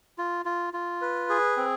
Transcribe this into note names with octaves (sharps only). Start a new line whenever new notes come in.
F4
F4
F4
B4
G#4
C4